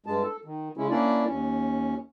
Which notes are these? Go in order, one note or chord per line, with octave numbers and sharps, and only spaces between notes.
G2 G#3 A5
A4
D#3
C#3 G#3 C#4 E4
A#3 C#4 D4 E4 D5
D#2 C#4